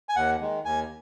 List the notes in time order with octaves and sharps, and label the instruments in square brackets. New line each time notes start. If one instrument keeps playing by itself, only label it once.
[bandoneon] G#5
D#2 F#5
D#3 G#3
D#2 G#5